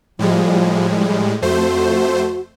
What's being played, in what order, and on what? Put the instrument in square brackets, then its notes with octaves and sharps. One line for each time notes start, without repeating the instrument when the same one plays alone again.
[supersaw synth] A2 G3 G#3 [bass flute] F3
[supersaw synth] F2 A3 C5 [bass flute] F#4